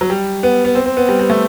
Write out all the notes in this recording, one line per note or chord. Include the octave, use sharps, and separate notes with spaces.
F#3
G3
B3
B3
C4
C4
B3
G3
G3
A3